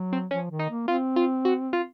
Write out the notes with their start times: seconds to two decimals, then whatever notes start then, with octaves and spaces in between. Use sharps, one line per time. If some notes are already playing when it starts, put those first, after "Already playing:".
Already playing: F#3
0.13 C4
0.31 F3 C#4
0.51 D#3
0.59 D#4
0.69 A#3
0.88 C4 F4
1.16 F4
1.45 F#4
1.73 F4